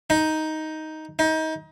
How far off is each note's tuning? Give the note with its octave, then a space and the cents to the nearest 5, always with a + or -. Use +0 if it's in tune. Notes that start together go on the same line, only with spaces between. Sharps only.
D#4 +10
D#4 +30